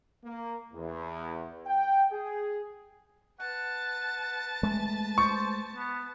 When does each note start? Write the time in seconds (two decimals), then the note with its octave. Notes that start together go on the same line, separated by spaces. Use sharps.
0.24 A#3
0.73 E2
1.66 G5
2.11 G#4
3.40 B4 F#5 A5
4.63 G#3 A3
5.18 C5 C#6
5.75 B3